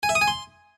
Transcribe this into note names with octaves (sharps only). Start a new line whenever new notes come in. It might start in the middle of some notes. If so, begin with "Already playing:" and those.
G#5
E5
D#6
G#5
C6